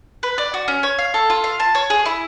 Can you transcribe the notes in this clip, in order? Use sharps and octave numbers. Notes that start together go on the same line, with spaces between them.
B4
D5
F#4
C#4
C#5
F5
A4
F4
F5
A5
C#5
G#4
E4